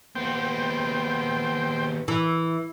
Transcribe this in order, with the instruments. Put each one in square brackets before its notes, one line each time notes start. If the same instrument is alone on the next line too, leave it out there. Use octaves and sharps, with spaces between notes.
[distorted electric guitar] D#2 B3 [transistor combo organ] C5 G5
[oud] E3